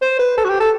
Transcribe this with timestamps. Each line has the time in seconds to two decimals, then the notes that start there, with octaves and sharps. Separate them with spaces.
0.02 C5
0.19 B4
0.38 A4
0.44 F#4
0.49 G4
0.60 A4